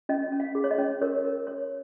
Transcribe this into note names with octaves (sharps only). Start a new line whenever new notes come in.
C#4 D#5
C#4
F5
G#4
C#5
D#5
C#4
A#4 C#5
A#4
C#5